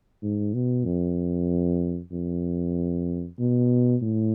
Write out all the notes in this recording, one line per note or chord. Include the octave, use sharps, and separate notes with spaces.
G#2
B2
F2
F2
B2
A2